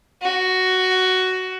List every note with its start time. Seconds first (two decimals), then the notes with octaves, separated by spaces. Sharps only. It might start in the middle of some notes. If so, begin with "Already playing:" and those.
0.22 F#4